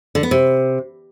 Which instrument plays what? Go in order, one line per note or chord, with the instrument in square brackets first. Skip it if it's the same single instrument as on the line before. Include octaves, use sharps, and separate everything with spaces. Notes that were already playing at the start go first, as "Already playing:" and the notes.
[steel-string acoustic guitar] D3
B3
C3